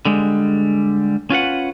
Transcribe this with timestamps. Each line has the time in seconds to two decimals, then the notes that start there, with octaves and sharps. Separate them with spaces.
0.05 D3 G3 G#3
1.30 C#4 F4 B4 F#5